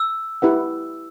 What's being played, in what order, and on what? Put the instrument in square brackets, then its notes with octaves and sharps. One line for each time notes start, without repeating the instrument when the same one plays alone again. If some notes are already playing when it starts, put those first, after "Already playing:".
Already playing: [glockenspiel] E6
[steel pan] E4 G4 B4 F#5